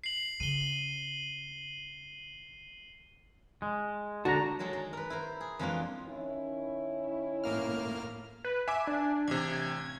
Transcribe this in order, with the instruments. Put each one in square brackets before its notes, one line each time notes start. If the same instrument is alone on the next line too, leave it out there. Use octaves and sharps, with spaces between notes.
[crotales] C7 F#7
[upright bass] C#3 [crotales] D#7 G7
[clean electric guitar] G#3
[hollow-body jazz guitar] D3 F#4 [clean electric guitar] A5 A#5
[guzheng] D#3 F#3 G#3 A4
G#3
A#4 B4
E4 A#4 C5
G#4
F2 E3 G#3 A#3 D4 F4
[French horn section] D#3 C#4 E4
[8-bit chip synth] A2 A#3 F6
[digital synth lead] B4
[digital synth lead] E5 [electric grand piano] G#5 D6
[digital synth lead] D4
[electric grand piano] A1 C3 [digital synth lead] G#6